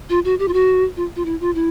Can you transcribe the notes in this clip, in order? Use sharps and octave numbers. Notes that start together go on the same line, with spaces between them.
F4
F#4
G4
F4
F#4
F4
F4
E4
F4
E4